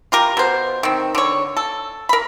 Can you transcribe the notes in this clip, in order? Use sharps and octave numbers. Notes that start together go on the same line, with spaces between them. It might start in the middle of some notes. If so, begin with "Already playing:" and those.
F4 G4 A#4
B2 C5
D#3 C4
D3 C#5
A4
A#4 B5